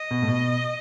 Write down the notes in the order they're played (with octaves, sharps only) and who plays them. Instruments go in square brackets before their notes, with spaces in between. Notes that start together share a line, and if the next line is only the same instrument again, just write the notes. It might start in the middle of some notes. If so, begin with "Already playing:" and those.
Already playing: [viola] D#5
[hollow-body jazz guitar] B2
A2
B2